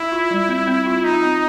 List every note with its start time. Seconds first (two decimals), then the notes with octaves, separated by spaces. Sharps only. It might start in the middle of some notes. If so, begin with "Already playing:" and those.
Already playing: E4
0.12 F4
0.31 G3
0.49 C4
0.67 C4
0.86 F4
1.04 D#4 F4
1.24 C4